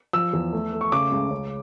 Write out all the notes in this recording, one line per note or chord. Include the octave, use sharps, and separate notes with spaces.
F3 E6
E2
A3
A3
C#6
C#3 D6
C#2
C#3